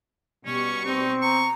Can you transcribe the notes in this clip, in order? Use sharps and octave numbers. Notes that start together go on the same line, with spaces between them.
B2 G3 C#4 C#6
C4 D#4
A#5 C#6